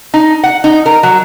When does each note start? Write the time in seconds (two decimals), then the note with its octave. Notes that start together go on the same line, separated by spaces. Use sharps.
0.14 D#4
0.43 F#5
0.64 D#4
0.86 A#4
1.03 F#3